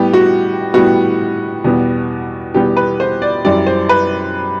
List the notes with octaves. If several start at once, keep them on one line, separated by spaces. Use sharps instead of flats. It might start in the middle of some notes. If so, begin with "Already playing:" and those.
Already playing: A2 G3 B3 G4
F#4
A2 G3 B3 F#4
E2 B2 G3 B3
E2 B2 G3 B3 G4
B4
C5
D5
F#2 E3 G3 D5
C5
B4